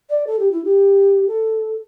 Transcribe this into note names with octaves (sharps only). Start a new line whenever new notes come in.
D5
A4
G4
E4
G4
A4